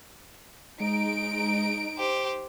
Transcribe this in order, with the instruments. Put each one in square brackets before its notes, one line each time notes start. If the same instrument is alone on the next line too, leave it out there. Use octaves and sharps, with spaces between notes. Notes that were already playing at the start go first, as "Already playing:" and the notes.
[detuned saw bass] G#3 [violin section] D#4 D7
[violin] G4 C5